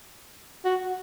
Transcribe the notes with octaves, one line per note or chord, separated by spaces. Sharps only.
F#4